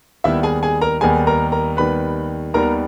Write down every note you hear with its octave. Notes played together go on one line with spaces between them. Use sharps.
D#2 D#3 G3 B3 E4 E5
G#4 G#5
G#4 G#5
A#4 A#5
D#2 D#3 G3 B3 G#4 G#5
A#4 A#5
A#4 A#5
D#2 D#3 G3 B3 B4 B5
D#2 D#3 G3 B3 A#4 A#5